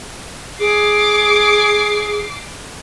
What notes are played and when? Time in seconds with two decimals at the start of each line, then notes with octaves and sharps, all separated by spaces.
0.60 G#4 D6 C7